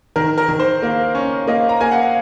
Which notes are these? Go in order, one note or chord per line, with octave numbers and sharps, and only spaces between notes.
D#3 A#4
A#4
D#3
C5
A#3
C#4
A#3 D#5
A#5
A#3 G#5
F#5
F5